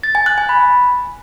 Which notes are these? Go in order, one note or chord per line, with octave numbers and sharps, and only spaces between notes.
A6
G#5
F#6
G#5
B5